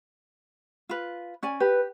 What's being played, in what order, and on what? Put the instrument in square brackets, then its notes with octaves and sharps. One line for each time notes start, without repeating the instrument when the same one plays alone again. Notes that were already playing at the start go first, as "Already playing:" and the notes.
[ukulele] F4 B4
C#4 D5 G#5
[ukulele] G4 [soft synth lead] B4